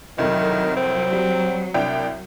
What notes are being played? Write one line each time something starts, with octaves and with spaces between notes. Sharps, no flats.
C2 F2 D#3 F#3
C4
G3
C2 D4 G5